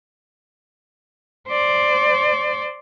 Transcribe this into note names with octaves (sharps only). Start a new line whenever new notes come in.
C5 D5